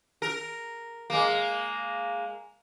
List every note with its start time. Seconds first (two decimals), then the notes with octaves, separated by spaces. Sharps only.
0.22 A#4
1.10 G#3 A#3